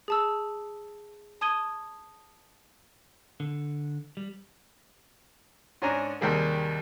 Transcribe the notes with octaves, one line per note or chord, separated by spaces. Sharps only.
G#4 A5 E6
A5 D#6 G#6 D#7 G7
D3
G3
G#2 C#4 D4 G#5 A#5
D#2 C3 G3 G#4 A#4